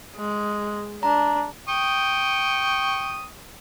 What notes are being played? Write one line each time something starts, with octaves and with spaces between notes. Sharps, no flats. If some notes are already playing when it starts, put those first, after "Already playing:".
G#3
D4 A#5
G5 C#6 D#6